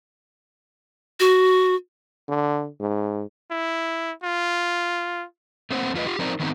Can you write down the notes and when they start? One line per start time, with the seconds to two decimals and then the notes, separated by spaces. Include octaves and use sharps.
1.20 F#4
2.28 D3
2.80 G#2
3.51 E4
4.23 F4
5.71 A3 A#3 C4 C5 F#5
5.94 F2 F4 B4 D#5
6.06 F4 G4
6.19 F3 C4 D#4 A#4 C5 D5
6.40 D#3 B3 C4 D#4